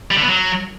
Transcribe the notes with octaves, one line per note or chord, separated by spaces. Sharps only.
G3
D3
B3
F#3